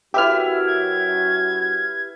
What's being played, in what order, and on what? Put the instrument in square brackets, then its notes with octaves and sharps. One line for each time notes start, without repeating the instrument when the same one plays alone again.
[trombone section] F#2 F#4 [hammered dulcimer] E4 B4 E5 [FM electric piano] G4 F6
[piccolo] G#6